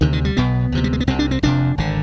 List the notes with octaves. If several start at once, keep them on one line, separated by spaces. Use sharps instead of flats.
D2 C3 D#3
D#3
G3
B1 B2 B3
D2 C3 F3
G3
G#3
B3
C2 C3 C4
D4
C4
F1 F2 C3 D4
G#1 D3